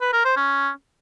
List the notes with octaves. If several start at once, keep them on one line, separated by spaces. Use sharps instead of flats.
B4
A#4
C5
C#4